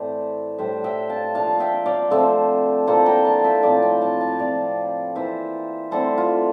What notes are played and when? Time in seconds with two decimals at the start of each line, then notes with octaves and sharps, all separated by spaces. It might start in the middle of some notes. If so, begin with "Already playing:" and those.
Already playing: A2 E3 A3 C4 E4 C5 D5
0.58 A2 G3 D4 C5 E5
0.84 E5 G5
1.09 F5 A5
1.35 F3 A#3 D4 F5 A5
1.60 E5 G5
1.86 D5 F5
2.10 D3 F3 A3 C4 C5 E5
2.87 D3 F3 A#3 E4 A4 C5
3.06 G5 A#5
3.25 F5 A5
3.44 E5 G5
3.63 A2 F3 C4 E4 D5 F5
3.82 E5 G5
4.01 F5 A5
4.20 F5 A5
4.39 F3 C4 E4 D5 F5
5.15 E3 A#3 E4 C5 E5
5.91 D3 A3 C4 E4 A4 C5
6.18 F4